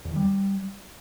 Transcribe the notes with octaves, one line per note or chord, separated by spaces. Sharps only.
E2
D#3
G3